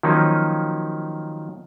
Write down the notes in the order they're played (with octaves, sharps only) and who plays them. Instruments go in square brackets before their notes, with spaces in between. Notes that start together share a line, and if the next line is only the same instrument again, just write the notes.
[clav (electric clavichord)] D#3 F3 F#3 A#3 C#4 D#4